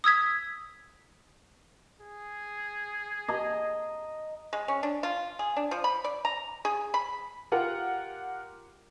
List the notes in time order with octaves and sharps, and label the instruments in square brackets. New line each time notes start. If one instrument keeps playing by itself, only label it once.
[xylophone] D#6 E6 G#6 B6
[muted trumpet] G#4
[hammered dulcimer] D#5 A#5
[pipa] G#3
C#4
D4
F4
G#4
D4
F3
B5
D5
A#5
G#4
B5
[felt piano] F4 G4 A#4 F#5